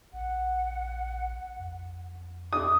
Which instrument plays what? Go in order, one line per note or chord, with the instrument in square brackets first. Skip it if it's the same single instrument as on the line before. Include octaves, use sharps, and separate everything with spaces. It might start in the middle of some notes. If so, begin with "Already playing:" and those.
[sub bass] A#1 [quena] F#5
[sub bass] F2
[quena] D6 [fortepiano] D#6